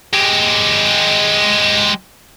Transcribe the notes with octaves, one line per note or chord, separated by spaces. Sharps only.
G#3 G4